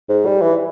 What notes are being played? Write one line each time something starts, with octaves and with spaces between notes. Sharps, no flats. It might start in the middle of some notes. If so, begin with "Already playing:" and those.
G#2
G3
E3